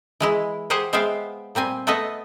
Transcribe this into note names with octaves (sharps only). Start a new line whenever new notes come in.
E3 G#3 E4
G4 G#4 C5 F#5 G#5
G#3 B3 C5 E5 F5 G5
A#2 G3 C4 G#5
A3 B3 A4 B4 D#5 E5